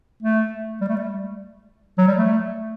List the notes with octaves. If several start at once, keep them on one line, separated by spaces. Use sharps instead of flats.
A3
G3
A3
G3
F#3
G3
A3